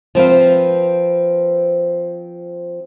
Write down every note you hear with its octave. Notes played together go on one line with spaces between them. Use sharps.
F3 C4 B4 F5